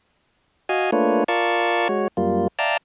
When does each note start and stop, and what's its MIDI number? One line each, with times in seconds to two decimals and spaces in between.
0.69 0.91 66
0.69 0.91 75
0.69 0.91 77
0.69 0.91 80
0.92 1.24 57
0.92 1.24 58
0.92 1.24 62
0.92 1.24 65
0.92 1.24 71
0.92 1.24 73
1.28 1.88 65
1.28 1.88 70
1.28 1.88 74
1.28 1.88 77
1.28 1.88 81
1.28 1.88 85
1.89 2.08 56
1.89 2.08 66
1.89 2.08 73
2.17 2.48 42
2.17 2.48 55
2.17 2.48 58
2.17 2.48 65
2.59 2.77 74
2.59 2.77 76
2.59 2.77 77
2.59 2.77 79
2.59 2.77 81
2.59 2.77 82